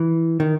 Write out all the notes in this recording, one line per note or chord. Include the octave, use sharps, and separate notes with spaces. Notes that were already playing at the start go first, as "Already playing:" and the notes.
Already playing: E3
D#3